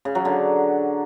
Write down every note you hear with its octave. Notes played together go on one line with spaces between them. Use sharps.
C#3
F#3
D3